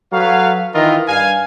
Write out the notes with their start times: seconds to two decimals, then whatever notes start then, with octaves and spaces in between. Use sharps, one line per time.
0.13 F#3 A4 B4 C#5 F5
0.75 D#3 E3 E4 F4 A#4 D#5
1.08 G2 F5 G#5